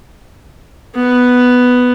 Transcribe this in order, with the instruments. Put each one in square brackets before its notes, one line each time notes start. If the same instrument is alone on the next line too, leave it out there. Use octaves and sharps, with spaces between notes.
[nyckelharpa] B3